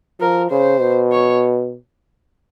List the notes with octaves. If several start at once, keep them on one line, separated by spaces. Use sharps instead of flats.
F3 A#4
C#3 C5
B2
C#5